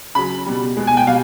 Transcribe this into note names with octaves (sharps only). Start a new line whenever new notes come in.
C#3 F#3 B5
B2 G3
B2 G#3
G#5
G5
B2 G3 F5